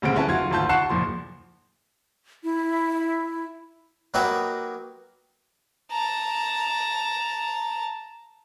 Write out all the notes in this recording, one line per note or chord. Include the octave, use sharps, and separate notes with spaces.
D#1 D2 C#3 C4 D7
C#4 E4 B4 A5
F#1 F4 F#4 G#6
G#1 D2 F4 A5 G6
F#5 A5 C#6 F#6 C7 E7
F#1 A#2 F3 C6
E4
F#3 A#3 D#4 F#4 G4 B4
A5 A#5